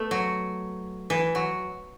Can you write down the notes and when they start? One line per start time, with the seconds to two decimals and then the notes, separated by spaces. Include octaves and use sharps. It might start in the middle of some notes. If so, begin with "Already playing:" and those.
Already playing: A3 B3
0.11 F#3
1.10 E3
1.35 F#3